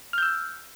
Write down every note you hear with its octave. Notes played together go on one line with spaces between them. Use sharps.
E6 F6 G6